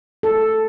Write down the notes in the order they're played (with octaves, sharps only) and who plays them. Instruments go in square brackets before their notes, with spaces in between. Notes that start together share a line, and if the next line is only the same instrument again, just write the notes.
[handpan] A4